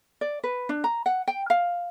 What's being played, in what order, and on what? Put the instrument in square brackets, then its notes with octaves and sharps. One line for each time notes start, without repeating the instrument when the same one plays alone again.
[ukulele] D5
B4
D4
A#5
F#5
G5
F5